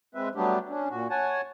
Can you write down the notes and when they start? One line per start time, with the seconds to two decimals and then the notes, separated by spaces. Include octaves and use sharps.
0.15 G#3 C4 B4 E5
0.35 F#3 G3 A3 B3 D4 G4
0.69 C#4 D4
0.90 A#2 F#4
1.10 C#5 F#5 G#5 A5